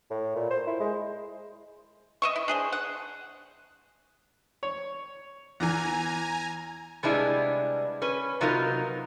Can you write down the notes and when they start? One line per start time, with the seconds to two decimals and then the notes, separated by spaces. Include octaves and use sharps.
0.10 A2
0.36 A#2
0.50 C5
0.67 E4
0.80 G#3
2.22 D#5 E5 C#6
2.36 E4
2.48 D4 G#4 C5
2.73 F#5
4.63 C#5
5.60 E2 E3 G#5 A#5
7.03 C3 G3 G#3 B3 D4 E4
8.02 C#4 B4
8.41 C3 F#3 B3 D#4 F4 A#4